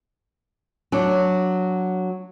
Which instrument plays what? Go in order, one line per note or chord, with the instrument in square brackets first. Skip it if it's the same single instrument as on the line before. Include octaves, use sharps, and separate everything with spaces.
[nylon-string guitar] F#3 D4